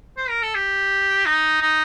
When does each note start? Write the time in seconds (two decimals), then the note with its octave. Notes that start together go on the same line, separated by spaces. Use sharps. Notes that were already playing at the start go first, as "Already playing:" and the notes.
0.17 C5
0.29 A#4
0.43 A4
0.55 G4
1.26 D#4
1.61 D#4